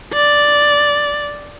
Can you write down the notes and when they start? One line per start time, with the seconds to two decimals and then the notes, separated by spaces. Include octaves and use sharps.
0.14 D5